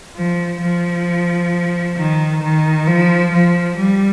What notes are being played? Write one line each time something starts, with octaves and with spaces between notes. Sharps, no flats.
F3
F3
D#3
D#3
F3
F3
G3